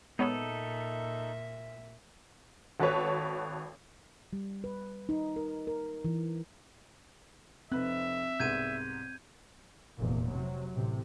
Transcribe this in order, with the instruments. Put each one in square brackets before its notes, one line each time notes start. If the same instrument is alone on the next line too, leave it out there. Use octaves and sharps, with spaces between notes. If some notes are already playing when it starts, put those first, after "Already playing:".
[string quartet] A#2 E5 [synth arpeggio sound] G#3 B3 C#5 [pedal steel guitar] D#4 A4
[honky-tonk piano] G#1 F#4 A4 B4 C#5
[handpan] G3
B4
D#4
A#4
A#4
E3
[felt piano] F1 B4 F#6 [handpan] C4 [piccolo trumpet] E5
[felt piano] C2 G#2 B3 [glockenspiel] G6 G#6 D#7
[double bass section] F1 E2 A#2
C3 F#3
A1 A2 C3